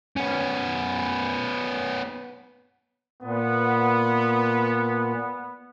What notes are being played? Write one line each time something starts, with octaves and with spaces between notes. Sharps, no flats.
B3 C#4
A#2 B3